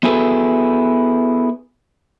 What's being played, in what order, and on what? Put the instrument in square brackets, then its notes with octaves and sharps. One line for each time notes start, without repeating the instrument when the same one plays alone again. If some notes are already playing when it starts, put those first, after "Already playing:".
[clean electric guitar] B3 E4 F#4 G#4 A4 B4